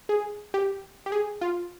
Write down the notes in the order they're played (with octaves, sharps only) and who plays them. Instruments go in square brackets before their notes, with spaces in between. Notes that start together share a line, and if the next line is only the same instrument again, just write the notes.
[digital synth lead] G#4
G4
G4
G#4
F4